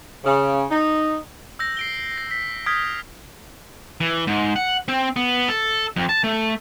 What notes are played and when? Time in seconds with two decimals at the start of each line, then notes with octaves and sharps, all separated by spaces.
0.24 C#3
0.70 D#4
1.59 E6 G6 A#6
1.77 C7 D7 G7
2.18 A#6
2.31 B6
2.66 D#6 F6 G6 G#6 B6 D7
4.01 E3
4.27 G#2
4.56 F#5
4.88 C4
5.16 B3
5.49 A4
5.96 F2
6.09 A5
6.24 A3